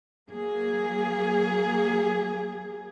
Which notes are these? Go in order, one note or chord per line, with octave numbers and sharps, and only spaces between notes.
F#3 A#3 G#4